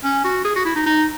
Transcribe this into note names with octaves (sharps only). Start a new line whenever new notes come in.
C#4
F#4
G#4
F#4
E4
D#4
D#4